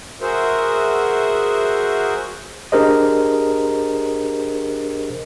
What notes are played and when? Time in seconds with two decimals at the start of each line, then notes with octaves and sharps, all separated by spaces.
0.21 F#4 G#4 A#4 C5 E5 F#5
2.72 D4 G4 G#4 A#4 C5 D#5